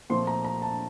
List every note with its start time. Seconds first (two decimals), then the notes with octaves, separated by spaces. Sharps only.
0.10 A#2 F3 A3 C4 C6
0.27 A#5
0.45 A#5
0.62 A5